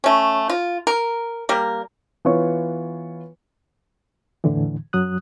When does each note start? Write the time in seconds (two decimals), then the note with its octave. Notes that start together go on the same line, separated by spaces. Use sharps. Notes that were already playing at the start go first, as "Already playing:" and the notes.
0.04 A3 C#4
0.49 F4
0.87 A#4
1.49 G3 A#3 A#4
2.25 E3 B3 F4 C#5 C#6
4.44 E2 A2 D3 E3
4.93 F#2 F#3 D#6 F#6